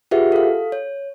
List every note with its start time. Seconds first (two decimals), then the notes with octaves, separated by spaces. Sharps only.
0.11 F4 G4 G#4 B4 E5 F#5
0.32 A4 F5
0.72 C#5